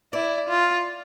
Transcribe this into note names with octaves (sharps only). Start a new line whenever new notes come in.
E4 D5
F4